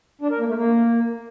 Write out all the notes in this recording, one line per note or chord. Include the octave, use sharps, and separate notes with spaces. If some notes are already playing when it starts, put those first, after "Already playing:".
D4
A#4
A#3
A3
A#3